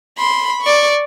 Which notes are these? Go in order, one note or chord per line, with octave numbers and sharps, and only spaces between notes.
B5 C6
D5 C#6